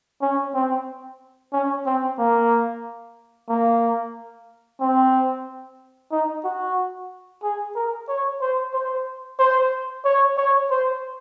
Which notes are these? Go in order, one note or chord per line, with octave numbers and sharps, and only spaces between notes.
C#4
C4
C#4
C4
A#3
A#3
C4
D#4
F#4
G#4
A#4
C#5
C5
C5
C5
C#5
C#5
C5